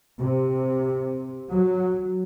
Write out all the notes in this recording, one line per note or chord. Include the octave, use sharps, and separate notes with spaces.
C3
F#3